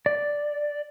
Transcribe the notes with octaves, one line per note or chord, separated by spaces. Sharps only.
D5